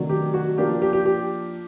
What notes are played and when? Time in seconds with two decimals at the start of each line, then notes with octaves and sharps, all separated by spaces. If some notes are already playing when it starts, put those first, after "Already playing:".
Already playing: C3 D#3 F#3 A3 D4
0.09 G4
0.34 F#4
0.58 F3 A#3 D4 G4
0.82 G4
0.93 G4
1.06 G4